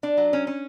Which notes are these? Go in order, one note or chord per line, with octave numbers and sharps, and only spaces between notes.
D4
F#3
C#4
C#4